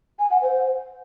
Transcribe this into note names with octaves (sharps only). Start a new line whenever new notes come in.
G#5
F#5
C5